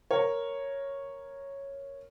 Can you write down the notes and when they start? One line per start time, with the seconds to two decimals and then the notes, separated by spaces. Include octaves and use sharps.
0.11 A#4 C#5